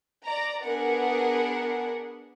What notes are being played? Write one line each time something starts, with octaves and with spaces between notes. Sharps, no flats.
D5 A#5
B3 D4 G#4 A#4 F#5